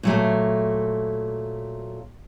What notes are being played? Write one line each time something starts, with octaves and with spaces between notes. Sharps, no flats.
A#2 F#3 A3